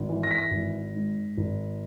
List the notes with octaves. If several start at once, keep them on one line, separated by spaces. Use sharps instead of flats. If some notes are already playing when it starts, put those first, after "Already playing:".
Already playing: G#1
E3
A#6
B6
A#6
G#1
G#2
G#1